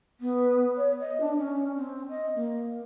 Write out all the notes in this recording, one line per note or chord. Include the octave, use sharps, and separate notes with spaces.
B3
C#5
D#5
D4
C#4
C4
D#5
A#3